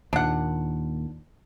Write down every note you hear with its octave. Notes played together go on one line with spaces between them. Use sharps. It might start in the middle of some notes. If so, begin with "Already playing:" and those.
D#2 A#2 D4 F#5